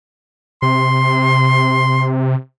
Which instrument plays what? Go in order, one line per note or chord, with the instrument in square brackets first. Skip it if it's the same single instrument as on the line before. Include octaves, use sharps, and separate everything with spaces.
[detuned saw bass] C3 [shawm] C6